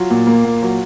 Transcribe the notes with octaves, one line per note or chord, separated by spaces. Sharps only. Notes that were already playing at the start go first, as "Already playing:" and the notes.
Already playing: F#3 F4
A#2
A#3
A#2
F#3